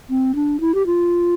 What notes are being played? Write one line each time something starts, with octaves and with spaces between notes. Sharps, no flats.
C4
D4
E4
G4
F4